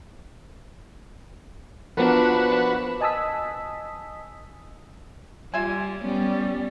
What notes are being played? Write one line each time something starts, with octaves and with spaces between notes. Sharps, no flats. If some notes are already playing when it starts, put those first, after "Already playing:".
F3 B3 D4 F#4 A#4 B4
D#5 G#5 A5 D#6 E6 B6
G3 F4 E5 G#5
G3 B3 C#4